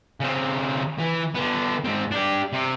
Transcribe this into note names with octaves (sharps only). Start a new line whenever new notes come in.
C#3 C4
E3
D3 B3
G#2 C4
D4 G4
C3